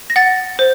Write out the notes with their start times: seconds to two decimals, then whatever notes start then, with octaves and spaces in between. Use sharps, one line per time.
0.10 A#6
0.16 F#5 A6
0.59 C5